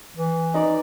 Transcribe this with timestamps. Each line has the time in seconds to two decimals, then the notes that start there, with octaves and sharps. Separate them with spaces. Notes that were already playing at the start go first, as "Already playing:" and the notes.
0.17 E3
0.54 D#4 D5